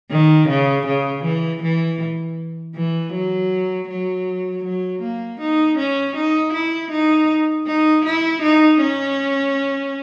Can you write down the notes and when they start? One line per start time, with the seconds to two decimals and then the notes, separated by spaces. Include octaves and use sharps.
0.11 D#3
0.49 C#3
0.86 C#3
1.24 E3
1.62 E3
2.76 E3
3.13 F#3
3.88 F#3
4.64 F#3
5.02 A#3
5.41 D#4
5.78 C#4
6.16 D#4
6.53 E4
6.91 D#4
7.67 D#4
8.05 E4
8.42 D#4
8.81 C#4